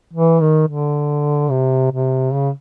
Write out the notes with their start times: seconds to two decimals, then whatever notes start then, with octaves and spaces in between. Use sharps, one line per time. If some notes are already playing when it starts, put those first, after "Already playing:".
0.13 E3
0.41 D#3
0.68 D3
1.50 C3
1.92 C3
2.33 C#3